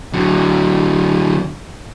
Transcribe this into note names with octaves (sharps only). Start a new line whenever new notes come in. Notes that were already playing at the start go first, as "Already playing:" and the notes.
D3 F#3